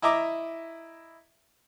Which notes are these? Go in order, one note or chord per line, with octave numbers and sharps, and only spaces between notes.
E4 D#5 E5 A#5 D6